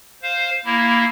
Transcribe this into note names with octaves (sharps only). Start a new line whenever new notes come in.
C5 F5
A#3 E4